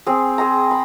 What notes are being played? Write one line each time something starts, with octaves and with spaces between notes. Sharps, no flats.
C4 G#4
G#4 C5 G5 A#5
B5